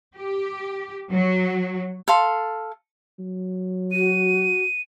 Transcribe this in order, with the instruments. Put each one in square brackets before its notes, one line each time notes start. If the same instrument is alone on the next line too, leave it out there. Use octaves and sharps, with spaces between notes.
[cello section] G4
F#3
[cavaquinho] A4 F5 C6
[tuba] F#3
[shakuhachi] F#4 [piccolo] D#7